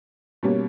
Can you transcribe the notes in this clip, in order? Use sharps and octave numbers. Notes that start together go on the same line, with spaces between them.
B2 G3 A#3 C#4